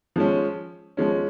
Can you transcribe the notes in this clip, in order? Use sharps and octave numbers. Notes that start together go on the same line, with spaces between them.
F3 G#3 C#4
F3 G#3 C#4